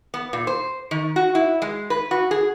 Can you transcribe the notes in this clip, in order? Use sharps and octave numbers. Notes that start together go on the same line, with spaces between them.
B3
A#2
C5
D#3
F#4
E4
G#3
B4
F#4
G#4